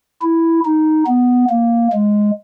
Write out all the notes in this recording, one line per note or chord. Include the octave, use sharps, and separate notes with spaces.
E4
D#4
B3
A#3
G#3